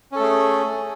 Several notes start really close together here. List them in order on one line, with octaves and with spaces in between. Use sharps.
C#4 A4 A3 G#4